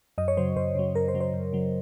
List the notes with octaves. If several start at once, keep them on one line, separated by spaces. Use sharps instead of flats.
F#2 D#5
C#5
C#3 F#3 C5
F#2 C5
C#3 F#3
F#2 A#4
C5
C#3 F#3
C5
F#2
C#3 F#3